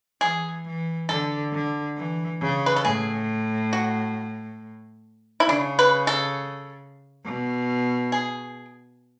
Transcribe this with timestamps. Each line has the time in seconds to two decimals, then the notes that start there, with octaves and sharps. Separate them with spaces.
0.21 E3 G#4
0.66 E3
1.09 D3 A4
1.53 D3
1.97 E3
2.41 C#3
2.66 B4
2.76 A4
2.85 A2 G#4
3.73 F#4
5.40 E4
5.49 C#3 D4
5.79 B4
6.07 A4
7.24 B2
8.12 G#4